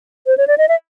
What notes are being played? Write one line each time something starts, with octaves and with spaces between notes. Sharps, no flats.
C5
C#5
D5
D#5
E5